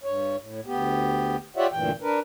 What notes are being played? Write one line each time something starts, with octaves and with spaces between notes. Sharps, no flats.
G2 C#5
A2
D2 B3 G4
F4 G4 C#5 D5 E5 F#5
D2 G2 A#2 E3 G5
D4 A#4 B4